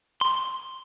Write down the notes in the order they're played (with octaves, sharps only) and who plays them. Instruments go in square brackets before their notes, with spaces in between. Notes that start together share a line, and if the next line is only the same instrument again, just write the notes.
[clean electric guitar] C6